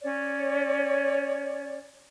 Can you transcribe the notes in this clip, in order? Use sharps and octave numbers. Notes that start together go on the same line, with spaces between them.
C#4 C#5 D5